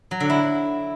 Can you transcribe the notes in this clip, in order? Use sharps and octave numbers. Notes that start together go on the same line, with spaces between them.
F#3
D3
E4